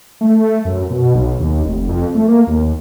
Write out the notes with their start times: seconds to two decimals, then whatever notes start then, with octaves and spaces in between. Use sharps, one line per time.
0.21 A3
0.65 F#2
0.90 B2
1.15 B1
1.40 D#2
1.65 F1
1.89 F2
2.15 A3
2.28 A#3
2.47 D#2